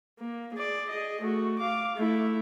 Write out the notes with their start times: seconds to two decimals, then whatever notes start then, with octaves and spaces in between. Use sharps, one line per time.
0.20 A#3
0.54 G#4 D5
0.90 G#4 D#5
1.21 A3 F#4
1.58 F5 D6
1.96 A3 E4